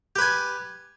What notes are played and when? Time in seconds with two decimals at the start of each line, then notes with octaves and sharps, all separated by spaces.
0.16 G4
0.19 B4
0.21 G#5